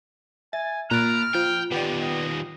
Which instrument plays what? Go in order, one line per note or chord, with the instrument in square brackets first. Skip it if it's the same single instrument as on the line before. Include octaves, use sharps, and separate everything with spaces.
[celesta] E5 [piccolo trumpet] G#5 [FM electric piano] A6
[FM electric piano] A#2 B5 A6 [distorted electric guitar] A#5 [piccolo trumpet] F6 [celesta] F#6 D7
[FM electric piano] F3 [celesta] F4 [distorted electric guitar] G5
[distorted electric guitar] D#3 G3 [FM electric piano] B3 G4 D5
[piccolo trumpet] D#5